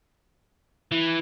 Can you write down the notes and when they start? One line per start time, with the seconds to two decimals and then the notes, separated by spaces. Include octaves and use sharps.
0.92 E3